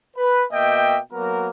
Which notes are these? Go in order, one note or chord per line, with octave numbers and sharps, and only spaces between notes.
B4
B2 A#3 D#5 E5 G5
F#3 A#3 B3 F#4 A#4